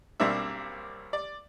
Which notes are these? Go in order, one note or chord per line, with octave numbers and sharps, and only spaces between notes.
B1 G3 A#3 C4 D4 E5
D5